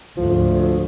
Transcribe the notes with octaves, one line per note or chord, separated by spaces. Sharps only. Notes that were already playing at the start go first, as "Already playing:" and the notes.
D2 G#2 F3